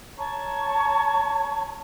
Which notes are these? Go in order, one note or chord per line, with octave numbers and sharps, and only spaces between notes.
C#5 A5 A#5 C#6